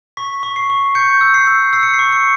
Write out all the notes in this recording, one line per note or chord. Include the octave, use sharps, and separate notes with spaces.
C#6 B6
C#6
C7
C#6
G6 C#7
E6
C7
E6
E6 C7
C#7
C7
C#6
C#7